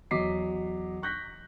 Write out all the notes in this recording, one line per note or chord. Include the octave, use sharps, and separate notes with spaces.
E2 F#3 D#5 D6 B6 C7
C#6 F#6 G6 A#6 B6